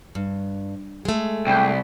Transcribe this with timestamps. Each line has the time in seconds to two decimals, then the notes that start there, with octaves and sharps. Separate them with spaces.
0.15 G2
1.05 G#3 A3
1.47 C2 G5